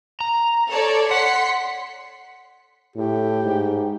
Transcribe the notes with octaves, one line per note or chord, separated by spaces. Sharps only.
A#5
A4 C#5 D5
F#5 C6 B6 C#7
A2 G4
G#2